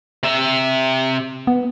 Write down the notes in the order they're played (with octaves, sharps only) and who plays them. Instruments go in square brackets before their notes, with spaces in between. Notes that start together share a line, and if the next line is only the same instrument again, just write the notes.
[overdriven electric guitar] C3 E5
[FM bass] B3